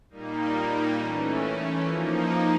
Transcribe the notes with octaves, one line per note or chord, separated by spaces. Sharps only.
A#2 G3 A#3 D#4
E3 A3 C#4
F3 A#3 D#4